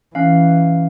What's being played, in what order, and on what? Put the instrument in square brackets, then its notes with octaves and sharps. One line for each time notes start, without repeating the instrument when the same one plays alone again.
[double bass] E3 [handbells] C#4 F5